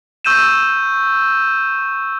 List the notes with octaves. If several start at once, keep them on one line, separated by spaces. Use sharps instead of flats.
C#6 E6 G6 D#7 E7